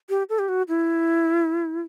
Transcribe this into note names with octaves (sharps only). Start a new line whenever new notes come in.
G4
A4
G4
F#4
E4